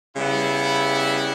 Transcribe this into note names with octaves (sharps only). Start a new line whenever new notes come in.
C#3 G3 B3 E4